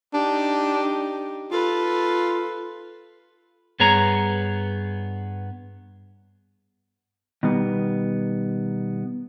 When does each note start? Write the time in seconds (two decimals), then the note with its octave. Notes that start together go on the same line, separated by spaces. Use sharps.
0.14 D4 D#4 G4
1.52 F4 A4 B4
3.80 G2 B3 G#4 C#5 A#5
7.43 B2 D#3 G3 B3